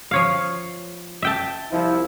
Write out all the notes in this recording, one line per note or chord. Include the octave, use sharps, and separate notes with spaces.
F3 C#5 F5
E5 G5 A5
C2 F3 E4